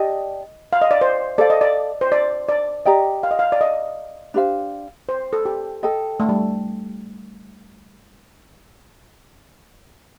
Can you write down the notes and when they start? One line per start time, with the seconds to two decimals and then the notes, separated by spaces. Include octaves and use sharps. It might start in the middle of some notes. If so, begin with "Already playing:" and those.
Already playing: G4 D5 D#5 A5
0.73 F5
0.82 D#5
0.91 D5
1.01 C5
1.38 A4 C5 D5 F5
1.50 D#5
1.61 D5
2.01 C5
2.12 D5
2.49 D5
2.86 G4 D5 D#5 G5 A#5
3.23 F5
3.31 D#5
3.39 F5
3.52 D5
3.61 D#5
4.34 D4 G4 C5 F5
5.09 C5
5.33 A4
5.45 G4
5.83 A4 D#5 G5
6.20 A3
6.29 G3